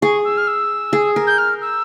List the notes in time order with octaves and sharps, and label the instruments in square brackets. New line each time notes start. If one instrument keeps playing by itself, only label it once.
[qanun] G#4 [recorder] C#6
[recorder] E6
F6
E6
[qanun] G#4
A#4
[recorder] G6
F6
E6